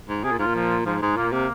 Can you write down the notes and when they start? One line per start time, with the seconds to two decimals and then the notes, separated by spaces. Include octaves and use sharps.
0.09 G#2
0.24 C3 G#4
0.31 A#2
0.39 G#2 F4
0.46 A#2
0.55 F3
0.86 G#2 F3
1.02 G#2 G#3
1.17 A#2 A#3
1.33 C3 A#3